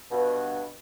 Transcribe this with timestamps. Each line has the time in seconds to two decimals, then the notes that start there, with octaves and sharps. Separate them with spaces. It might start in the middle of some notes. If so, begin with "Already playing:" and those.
0.11 G2 B2